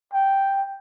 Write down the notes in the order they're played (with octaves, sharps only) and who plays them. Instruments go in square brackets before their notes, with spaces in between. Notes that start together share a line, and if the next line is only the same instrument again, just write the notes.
[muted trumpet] G5